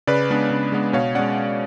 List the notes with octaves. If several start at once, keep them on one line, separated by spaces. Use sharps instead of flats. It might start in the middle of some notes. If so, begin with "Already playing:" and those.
C#3 B4 D5
G#3 B3 D4
C#3
G#3 B3 D4
B2 C#5 F5
G#3 C#4 D5 F#5